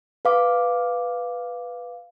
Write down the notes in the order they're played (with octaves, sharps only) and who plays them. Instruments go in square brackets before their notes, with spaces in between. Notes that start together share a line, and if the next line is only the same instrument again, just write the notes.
[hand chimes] B4 F5 D6